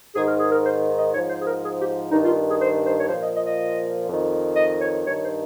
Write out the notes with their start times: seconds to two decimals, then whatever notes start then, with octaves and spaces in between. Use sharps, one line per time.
0.14 G#2 D#3 G#4
0.27 A#4
0.39 G#4
0.51 A#4
0.64 C5
0.97 D#5
1.13 G#2 F3 C#5
1.29 C5
1.41 G#4
1.46 A#4
1.62 G#4
1.79 G4
2.11 G2 D#3 D#4
2.24 F4
2.48 G#4
2.60 C5
2.85 C5
2.99 C#5
3.09 F3 C5
3.13 A#2
3.21 D#5
3.34 D#5
3.46 D#5
4.08 F2 D#3
4.56 D#5
4.81 C#5
5.05 G2 D#3 C#5
5.22 C5